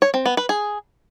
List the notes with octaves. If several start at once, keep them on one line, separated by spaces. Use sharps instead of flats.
C#5
C4
B3
B4
G#4